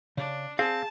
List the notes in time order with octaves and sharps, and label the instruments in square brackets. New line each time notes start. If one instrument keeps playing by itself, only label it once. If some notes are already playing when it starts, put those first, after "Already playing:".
[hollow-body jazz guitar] C#3 [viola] D4
[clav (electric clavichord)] C4 [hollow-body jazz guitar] G#4 G#5 [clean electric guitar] F5 [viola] A5